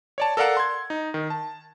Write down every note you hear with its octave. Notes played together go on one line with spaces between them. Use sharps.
C#5 D5 A5
A4 A#4 D5 F5 F#5 A5
C6 G#6
D#4
D#3
A5